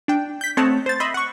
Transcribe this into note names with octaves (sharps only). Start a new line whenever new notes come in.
D4 G5
G6 B6
A3 C4 C#5 D#5 F#5 A5
C5 A6
D#5 E5 B5 C6
F#5 C#6